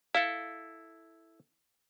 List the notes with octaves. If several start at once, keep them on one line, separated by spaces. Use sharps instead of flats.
E4 A4 F5